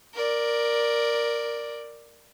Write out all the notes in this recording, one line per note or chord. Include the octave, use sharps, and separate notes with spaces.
A#4 D5